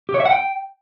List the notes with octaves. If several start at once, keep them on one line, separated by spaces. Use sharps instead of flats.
G4
C#5
E5
F#5
G5